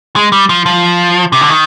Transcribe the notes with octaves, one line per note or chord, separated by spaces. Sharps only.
G#3
G3
F3
F3
C3
D3
D#3